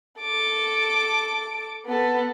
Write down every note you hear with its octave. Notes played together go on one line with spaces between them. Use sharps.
A4 D6
B3 A4